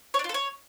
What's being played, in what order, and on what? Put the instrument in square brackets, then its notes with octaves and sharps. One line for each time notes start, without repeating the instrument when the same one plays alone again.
[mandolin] C#5
D4
F4
A4
C#5